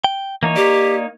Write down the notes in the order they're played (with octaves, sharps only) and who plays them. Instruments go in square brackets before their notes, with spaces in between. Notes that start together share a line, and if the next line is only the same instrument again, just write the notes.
[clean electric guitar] G5
[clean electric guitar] E3 [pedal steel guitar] A#3 D#4 C#5
[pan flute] G4 [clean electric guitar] D5